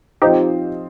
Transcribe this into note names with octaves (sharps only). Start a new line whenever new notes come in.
F3 C4 D#4 F4 G4 C5 D#5